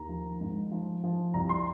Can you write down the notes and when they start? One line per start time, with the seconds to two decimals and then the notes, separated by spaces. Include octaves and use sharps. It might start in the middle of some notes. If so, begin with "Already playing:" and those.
Already playing: D#2 A#5
0.09 F3
0.41 G#2
0.71 F3
1.04 F3
1.34 C2 A#5
1.49 C6